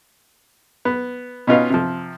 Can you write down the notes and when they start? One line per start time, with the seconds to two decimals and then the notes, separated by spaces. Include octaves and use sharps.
0.85 B3
1.47 B2 C#4 D#4 F4 B4 F5
1.70 C3 F3